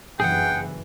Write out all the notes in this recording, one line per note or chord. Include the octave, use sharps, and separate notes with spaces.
F#1 G2 E3 G#4 F#5 G5